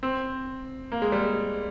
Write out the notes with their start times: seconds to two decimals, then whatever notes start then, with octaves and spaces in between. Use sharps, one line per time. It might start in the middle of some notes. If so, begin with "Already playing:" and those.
0.03 C4
0.92 A#3
1.02 G#3
1.12 G3
1.22 G#3